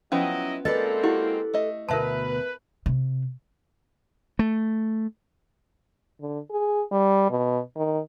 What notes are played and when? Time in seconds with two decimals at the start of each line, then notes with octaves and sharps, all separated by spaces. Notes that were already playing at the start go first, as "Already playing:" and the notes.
0.12 F3 F#3 B3 C#4 E4 D#5
0.65 G#3 A#3 C4 A4 B4 D5 D#5
1.03 E4 F#4 G4
1.54 A3 D#5
1.89 D2 B2 A#4 B4 E5 A5 A#5
2.86 C3
4.39 A3
6.21 D3
6.51 G#4
6.92 G3
7.31 B2
7.76 D#3